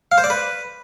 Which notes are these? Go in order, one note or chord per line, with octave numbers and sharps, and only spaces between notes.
F5
C5
D5
B4